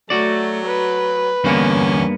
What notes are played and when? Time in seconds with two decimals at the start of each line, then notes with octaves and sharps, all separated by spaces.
0.10 F#3 A3 F#4 D5
0.66 B4
1.44 E2 G2 D3 A#3 B3 C#4